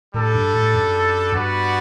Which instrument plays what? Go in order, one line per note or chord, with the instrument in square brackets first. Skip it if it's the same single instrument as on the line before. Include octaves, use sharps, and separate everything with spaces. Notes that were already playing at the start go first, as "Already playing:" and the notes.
[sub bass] A2 [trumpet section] G3 D4 A4
[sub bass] G2
A2
F#2
[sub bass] G2 [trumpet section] G3 B3 F#4 B4 D5